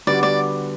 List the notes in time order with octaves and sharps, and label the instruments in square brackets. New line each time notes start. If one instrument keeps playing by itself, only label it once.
[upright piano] D3 G3 B3 D4 F#4 [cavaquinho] D5
[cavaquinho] D5